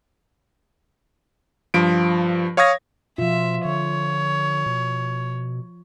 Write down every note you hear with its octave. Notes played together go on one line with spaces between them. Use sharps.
G2 F3 D7
C#5 F5 C#6 D#6 G#6 A#6
B2 F3 F4 E5
D3 C#5
B2